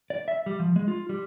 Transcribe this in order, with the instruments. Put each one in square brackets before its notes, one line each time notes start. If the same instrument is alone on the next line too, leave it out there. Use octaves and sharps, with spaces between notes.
[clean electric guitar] D5
E5
G3
F3
G#3
F4
G3